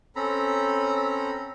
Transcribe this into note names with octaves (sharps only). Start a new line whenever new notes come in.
C4 C#4 A4 A#5 B5